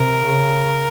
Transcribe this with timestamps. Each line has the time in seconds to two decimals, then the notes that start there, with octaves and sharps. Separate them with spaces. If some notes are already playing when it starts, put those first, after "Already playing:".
Already playing: C3 A#4
0.24 C#3